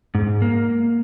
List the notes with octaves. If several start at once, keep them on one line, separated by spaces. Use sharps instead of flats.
G#2
A#3